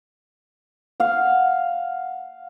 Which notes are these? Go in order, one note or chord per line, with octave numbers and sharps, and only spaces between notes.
F5 F#5